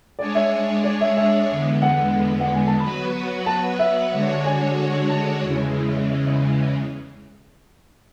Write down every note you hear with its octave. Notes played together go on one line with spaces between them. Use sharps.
G#3 D4 G#4 C#5 D5
E5
D5
E5
E5
E2 D3 G#3 B3
F#5
F#5
G#5
A5
F#3 B3 F#4 B4 B5
A5
E5
D3 G#3 D4 F#4 C#5
G#5
A5
E2 C#3 E3 G#3